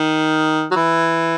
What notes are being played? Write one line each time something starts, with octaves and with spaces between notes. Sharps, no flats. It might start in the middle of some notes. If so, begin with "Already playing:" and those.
Already playing: D#3
F#3
E3